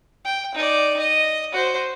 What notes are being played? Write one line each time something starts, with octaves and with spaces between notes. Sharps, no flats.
G5
D#4 D5
D#5
F#4 C5